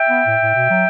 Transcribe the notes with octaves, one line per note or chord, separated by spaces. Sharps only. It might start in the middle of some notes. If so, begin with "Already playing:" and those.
Already playing: E5 G5
B3
A2
A2
B2
F#3